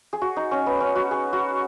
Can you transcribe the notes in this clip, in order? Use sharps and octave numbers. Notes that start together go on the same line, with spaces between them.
G#4
F#4
D#4
C#4
B3
C#4
F#4
G#4
F#4